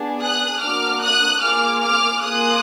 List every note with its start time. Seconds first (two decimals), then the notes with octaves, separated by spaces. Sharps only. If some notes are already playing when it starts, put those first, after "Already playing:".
Already playing: B3 D4 G#4
0.21 D#6 F#6
0.61 A#3 D4 F#4 D6 F6
1.01 D#6 F#6
1.42 A#3 F4 G#4 D6 F6
1.82 D6 F6
2.22 A#3 F4 G#4 D#6 F#6